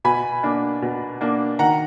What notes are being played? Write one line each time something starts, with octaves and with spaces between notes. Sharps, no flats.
B2 G#5 B5
A#3 D4
B2
A#3 D4
D#3 F#5 A#5